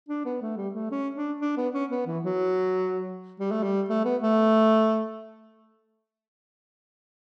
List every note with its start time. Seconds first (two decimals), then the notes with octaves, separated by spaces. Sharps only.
0.09 D4
0.25 B3
0.42 A3
0.57 G3
0.75 A3
0.91 C#4
1.15 D4
1.41 D4
1.57 B3
1.74 C#4
1.91 B3
2.07 E3
2.24 F#3
3.40 G3
3.51 A3
3.63 G3
3.89 A3
4.05 B3
4.22 A3